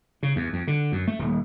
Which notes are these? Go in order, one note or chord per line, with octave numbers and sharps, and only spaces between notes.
C#3
E2
F2
D3
F#2
A3
D#1